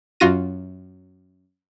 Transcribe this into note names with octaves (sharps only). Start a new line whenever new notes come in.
F#2 F4 F#4 A#6 D#7